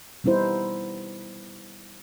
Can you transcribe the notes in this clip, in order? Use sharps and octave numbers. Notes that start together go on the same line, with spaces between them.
G3 B3 D#4 E4 C5